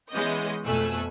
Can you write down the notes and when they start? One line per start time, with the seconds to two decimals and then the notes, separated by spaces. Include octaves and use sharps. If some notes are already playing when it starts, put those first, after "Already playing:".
0.11 E3 G#3 B3 C#4 D#5 G6
0.64 F2 B2 A3 G#5 E6 F#6